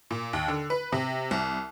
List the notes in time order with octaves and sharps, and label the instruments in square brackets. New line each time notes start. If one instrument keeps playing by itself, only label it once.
[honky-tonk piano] A#2
D#2
D3
B4
C3
C2